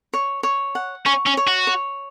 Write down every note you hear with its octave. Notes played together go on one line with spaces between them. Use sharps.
C#5
C#5
F#5
C#4 C#6
C#4
C#5
F#4
C#5